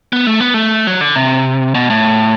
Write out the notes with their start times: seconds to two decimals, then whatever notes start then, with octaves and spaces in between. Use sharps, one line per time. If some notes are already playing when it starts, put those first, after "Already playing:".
0.13 B3
0.27 A3
0.40 B3
0.54 A3
0.87 F#3
1.01 D3
1.16 C3
1.75 B2
1.90 A2